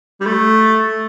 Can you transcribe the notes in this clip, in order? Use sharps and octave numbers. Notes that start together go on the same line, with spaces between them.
G3
A3